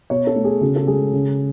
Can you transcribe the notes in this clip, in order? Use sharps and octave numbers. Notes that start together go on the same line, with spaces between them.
B2 C#5
A4
A3
G#4
C#3 F#4
A4
G#3 G#4
C#3